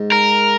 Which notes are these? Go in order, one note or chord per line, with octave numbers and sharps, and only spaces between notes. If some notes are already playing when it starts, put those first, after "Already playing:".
Already playing: G#2
A#4